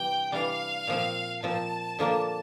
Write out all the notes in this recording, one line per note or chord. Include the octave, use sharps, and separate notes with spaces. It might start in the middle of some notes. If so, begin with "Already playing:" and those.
Already playing: C3 E3 G3 D4 G5
C3 E3 G3 D4 F5
A#2 F3 C4
A#2 F3 C4 A5
D3 F3 A#3 D4